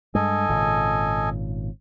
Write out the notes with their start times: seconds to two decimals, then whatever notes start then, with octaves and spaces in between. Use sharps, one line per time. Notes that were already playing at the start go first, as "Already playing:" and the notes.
0.15 G2 G#3 A4 D#5 G#5
0.49 G#1 A#2 C#3